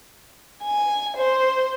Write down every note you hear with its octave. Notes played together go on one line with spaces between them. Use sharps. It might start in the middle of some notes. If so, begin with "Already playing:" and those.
G#5
C5